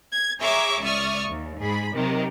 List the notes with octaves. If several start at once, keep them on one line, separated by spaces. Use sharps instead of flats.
G#6
G#4 C#5 E5 A#5 C#6 D6
C#2 D5 E5 C#6 D#6 F6
D#2
G#2 G#4 B5
C3 D#3 F#3